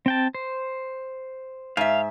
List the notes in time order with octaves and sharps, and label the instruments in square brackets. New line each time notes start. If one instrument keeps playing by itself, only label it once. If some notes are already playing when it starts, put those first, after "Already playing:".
[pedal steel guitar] C4 G5 A5
C5
[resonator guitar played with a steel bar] G#2 E5 [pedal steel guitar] F5